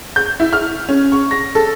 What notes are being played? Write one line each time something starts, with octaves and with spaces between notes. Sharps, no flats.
G6
E4
F6
C#4
C#6
A#6
A4